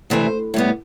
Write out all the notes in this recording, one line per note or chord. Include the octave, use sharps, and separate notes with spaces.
D2 C3 E3 A3 C4 C5
A2 G3 B3